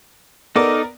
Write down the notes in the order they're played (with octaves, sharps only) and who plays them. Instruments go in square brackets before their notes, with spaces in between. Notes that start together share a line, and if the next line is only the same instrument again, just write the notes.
[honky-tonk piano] B3 A#4 D5 [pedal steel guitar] D#4 A4 D6